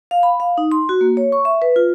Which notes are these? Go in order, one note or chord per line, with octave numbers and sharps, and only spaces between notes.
F5
B5
F5
D#4
C6
F#4
A#3
C#5
C#6
E5
B4
F4